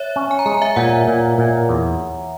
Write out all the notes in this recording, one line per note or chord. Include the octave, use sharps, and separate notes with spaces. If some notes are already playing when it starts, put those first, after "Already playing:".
Already playing: C#5 E5
C#4
G#5
A#5
G#3 G#5
A#5
E5 G#5
A#2 F#5 A#5
A#2
A#2
E2